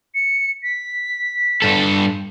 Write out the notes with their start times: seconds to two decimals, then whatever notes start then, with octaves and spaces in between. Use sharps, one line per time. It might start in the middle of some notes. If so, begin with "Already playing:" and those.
0.15 C#7
0.63 B6
1.62 G2 A4